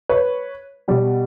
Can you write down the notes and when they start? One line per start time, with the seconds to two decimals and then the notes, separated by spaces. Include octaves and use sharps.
0.09 B4 C#5
0.88 B2 G3